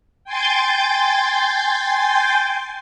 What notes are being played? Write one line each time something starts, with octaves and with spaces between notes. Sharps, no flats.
G5 G#5 C6 G6 A6